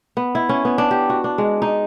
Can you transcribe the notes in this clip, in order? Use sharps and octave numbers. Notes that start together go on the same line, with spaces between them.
B3
E4
C#4
B3
D4
G4
F#4
D4
G#3
D#4